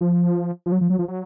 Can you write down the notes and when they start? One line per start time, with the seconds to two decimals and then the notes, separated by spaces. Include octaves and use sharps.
0.01 F3
0.66 F3
0.72 F#3
0.81 F3
0.90 F#3
0.99 F3
1.08 F#3